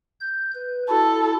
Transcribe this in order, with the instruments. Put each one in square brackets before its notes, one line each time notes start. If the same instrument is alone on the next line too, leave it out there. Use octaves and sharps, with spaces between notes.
[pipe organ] G6
B4
[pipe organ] E4 F#4 [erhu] A4